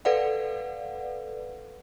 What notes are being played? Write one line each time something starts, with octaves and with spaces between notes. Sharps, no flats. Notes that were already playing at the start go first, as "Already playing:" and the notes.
A4 B4 D5 F5 F#5